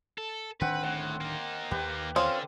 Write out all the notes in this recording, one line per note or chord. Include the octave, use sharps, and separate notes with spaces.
A4
D1 D#3 C4 D4 B4 F#5
A2 F#5
A#3 D#4
D#2 G4 B4
D3 C4 C#4 F4